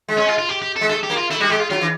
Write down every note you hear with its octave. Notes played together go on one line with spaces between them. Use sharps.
G#3
C#4
F4
F4
G4
G4
A4
G#3
A3 A4
G4
A#3
F4
A3 E4
G3 F#4
G#3 G4
F4
F#3 F4
E3